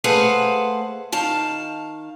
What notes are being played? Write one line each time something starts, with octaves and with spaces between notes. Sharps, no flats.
A3 G#4 B4 C5 F5 F#5
D#3 F5 A5